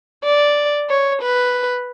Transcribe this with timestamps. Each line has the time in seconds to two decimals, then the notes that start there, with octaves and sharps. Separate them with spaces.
0.24 D5
0.89 C#5
1.21 B4